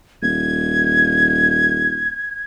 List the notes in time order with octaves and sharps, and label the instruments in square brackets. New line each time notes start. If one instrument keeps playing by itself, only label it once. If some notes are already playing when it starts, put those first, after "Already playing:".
[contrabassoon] D#1 [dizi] G#6